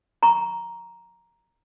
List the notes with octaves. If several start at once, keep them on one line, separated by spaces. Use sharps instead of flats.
A#5 C#6